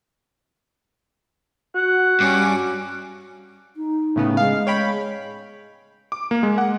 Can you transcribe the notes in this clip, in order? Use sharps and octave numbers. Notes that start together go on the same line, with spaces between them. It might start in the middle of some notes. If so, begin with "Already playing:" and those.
F#4 F#5
G2 C#4 D6
D#4
A2 C#3 B3
G#3 F5
C#5 G5 B5
D6
A#3
G#3
F#5